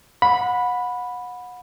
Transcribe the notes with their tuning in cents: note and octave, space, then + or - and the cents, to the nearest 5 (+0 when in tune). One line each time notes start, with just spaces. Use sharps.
F#5 -30 B5 +0